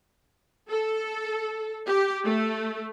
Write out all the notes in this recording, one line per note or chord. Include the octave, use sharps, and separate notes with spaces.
A4
G4
A3